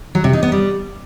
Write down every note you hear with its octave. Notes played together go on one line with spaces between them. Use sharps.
F#3
C3
D#4
B3
G3